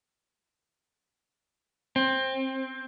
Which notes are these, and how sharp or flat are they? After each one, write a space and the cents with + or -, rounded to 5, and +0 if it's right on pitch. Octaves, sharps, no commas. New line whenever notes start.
C4 +15